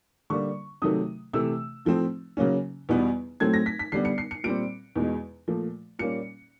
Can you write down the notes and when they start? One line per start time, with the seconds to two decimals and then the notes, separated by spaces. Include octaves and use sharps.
0.30 D3 G3 A#3 C#6
0.82 C3 D#3 F#3 A3 D#6
1.33 C3 E3 A3 E6
1.85 A2 F3 A3 C4
2.37 C#3 F#3 A#3 C#4
2.89 E2 B2 G3 B3
3.40 A2 F#3 A3 C4 G#6
3.54 A#6
3.66 B6
3.79 B6
3.92 D3 G3 B3 C7
4.05 C#7
4.18 C7
4.31 C#7
4.44 A#2 G3 C4 D7
4.96 E2 B2 G#3
5.48 A#2 F3 A3
5.99 A#2 G3 A#3 C#4 C#7